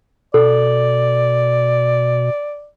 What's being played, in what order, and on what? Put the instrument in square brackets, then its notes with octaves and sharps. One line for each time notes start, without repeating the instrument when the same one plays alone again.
[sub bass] B2 [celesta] A4 [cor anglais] D5